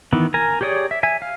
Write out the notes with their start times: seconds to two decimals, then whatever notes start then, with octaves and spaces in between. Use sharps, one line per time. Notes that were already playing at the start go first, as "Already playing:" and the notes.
0.13 D#3 E3 B3
0.34 A#4 G#5 A#5
0.61 G4 G#4 C#5 D5 D#6
0.91 E5
1.03 E5 G#5
1.22 F5